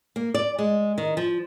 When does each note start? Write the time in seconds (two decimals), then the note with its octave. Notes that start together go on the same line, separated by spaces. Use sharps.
0.16 A#3
0.34 D5
0.59 G#3
0.98 D#3
1.17 F3